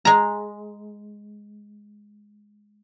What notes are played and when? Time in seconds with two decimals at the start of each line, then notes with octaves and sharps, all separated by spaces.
0.05 G#3 A#5